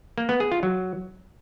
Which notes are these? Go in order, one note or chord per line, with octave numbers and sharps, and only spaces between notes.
A#3
B3
G#4
F4
F#3